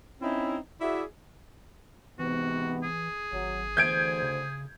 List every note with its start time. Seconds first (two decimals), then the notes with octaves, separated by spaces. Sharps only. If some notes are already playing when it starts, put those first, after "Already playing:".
0.21 C4 C#4 D#4 E4
0.81 E4 F#4 G#4 D5 E5
2.19 G#2 C3 E3 B3 F#4
2.83 G#4
3.32 G#1 F#3
3.77 D2 E3 C5 G6 G#6 D7
4.23 C#3